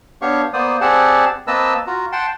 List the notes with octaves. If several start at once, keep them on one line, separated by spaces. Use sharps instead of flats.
B3 D4 G4 C#5 F5 C#6
A#3 B3 C5 D5 D#6
C4 G4 G#4 D5 F#5 A5
A#3 C4 B4 D#5 A5 E6
F4 F#4 A#5
F#5 G5 A5 C6